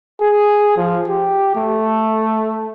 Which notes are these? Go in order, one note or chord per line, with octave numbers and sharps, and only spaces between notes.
G#4
F3
G4
A3